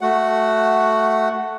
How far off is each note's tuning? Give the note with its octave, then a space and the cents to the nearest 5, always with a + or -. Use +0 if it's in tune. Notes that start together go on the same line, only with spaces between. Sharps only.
A3 +0 F#4 +0 F#5 +5